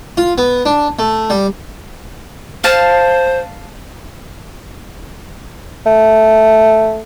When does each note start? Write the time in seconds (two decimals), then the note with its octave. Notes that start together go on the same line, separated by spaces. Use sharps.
0.17 F4
0.38 B3
0.66 D4
0.99 A3
1.30 G3
2.64 C5 F5 A5
5.86 A3